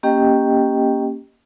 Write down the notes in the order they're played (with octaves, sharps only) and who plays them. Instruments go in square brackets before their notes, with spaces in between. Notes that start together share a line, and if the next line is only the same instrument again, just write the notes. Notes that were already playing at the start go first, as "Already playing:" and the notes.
[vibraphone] A#3 C#4 G4 D#5 G5